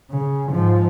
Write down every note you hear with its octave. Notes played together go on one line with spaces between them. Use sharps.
C#3
G#2 F3